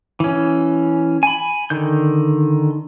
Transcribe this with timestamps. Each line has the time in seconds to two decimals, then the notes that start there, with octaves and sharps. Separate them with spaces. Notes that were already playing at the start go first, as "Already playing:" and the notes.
0.20 E3 C#4
1.23 G#5 B5
1.70 D3 D#3 G6